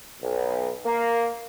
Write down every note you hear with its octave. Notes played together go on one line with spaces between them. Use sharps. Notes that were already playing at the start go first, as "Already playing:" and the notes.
B1
A#3